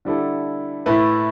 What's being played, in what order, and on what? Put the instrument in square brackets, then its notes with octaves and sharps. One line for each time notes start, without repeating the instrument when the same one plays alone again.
[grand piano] D3 G3 E4 A4
A2 A3 E4 B4